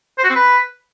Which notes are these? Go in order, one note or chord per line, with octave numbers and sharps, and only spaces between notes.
C5
F#4
C4
B4